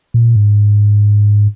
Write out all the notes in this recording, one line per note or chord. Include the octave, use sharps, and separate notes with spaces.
A#2
G#2